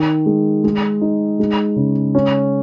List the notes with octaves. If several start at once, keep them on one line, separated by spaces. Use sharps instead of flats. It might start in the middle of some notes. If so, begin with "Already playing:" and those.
Already playing: D#3
G#3
G#3
D#4
G#3
C#3
C#4